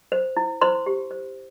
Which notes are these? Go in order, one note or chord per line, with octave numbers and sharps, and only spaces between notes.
C5
E4
E4 C5 C6
G4
C5